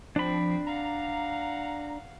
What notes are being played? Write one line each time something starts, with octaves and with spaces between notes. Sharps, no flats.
F3 C4 D4 B5
F5 F#5 A#5